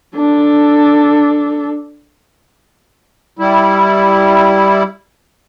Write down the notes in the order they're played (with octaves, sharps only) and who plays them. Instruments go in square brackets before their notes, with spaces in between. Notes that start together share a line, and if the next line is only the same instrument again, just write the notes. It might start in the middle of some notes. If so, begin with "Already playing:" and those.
[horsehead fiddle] D4 A4
[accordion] G3 E4